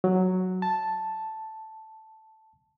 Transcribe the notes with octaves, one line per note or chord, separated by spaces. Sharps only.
F#3
A5